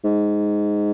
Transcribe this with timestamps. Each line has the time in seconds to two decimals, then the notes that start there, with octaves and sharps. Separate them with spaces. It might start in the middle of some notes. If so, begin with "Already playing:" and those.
0.04 G#2